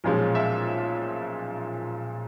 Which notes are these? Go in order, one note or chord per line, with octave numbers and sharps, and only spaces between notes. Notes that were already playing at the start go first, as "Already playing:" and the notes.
B1 A#2 F3 G#3 C#4
E5